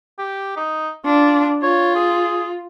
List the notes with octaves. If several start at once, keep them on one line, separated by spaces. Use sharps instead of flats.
G4
D#4
D4 F4
F4 C#5
G#4